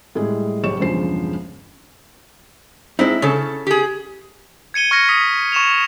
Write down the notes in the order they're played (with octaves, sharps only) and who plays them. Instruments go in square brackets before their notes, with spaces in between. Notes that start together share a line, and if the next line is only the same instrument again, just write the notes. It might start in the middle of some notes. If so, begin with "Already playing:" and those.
[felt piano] A2 G3 G#3 G#4
F#1 B1 G4 C#5 C#6 E7
E1 G2 C#3 F3 C5 C7
[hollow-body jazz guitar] G#3 C4 D#4 [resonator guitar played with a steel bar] E4
[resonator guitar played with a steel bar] C#3 A4 [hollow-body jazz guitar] C#4
[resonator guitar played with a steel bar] G4 G#4
[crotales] G#6 C#7 D#7 G7
C#6 F6 G#6 A#6 C#7 D#7
D#6 B6
C#6 E7 F7